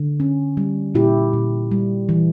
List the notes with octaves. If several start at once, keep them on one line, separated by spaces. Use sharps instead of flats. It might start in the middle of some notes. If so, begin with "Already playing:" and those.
Already playing: D3
C#4
G3
A#2 E4 G4
A#2
G3
E3